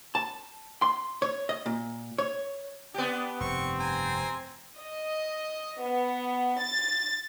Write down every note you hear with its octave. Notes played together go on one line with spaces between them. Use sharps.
A5
C6
C#5
D#5
A#2
C#5
B3 D4 G4
F1 G2 C4 C#6
G#5 A#5
D#5
B3
A6